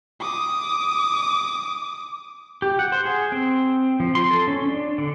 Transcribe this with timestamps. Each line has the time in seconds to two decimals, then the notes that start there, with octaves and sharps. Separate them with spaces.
0.20 D6 D#6
2.62 G4
2.79 F#5
2.92 C5
3.05 G#4
3.32 C4
4.00 F3
4.15 C6
4.31 A4
4.48 C#4
4.68 D4
4.98 D3